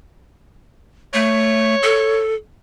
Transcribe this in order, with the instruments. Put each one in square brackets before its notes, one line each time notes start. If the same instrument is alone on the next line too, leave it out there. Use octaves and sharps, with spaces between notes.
[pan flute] A3 [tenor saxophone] C#5
[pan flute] A4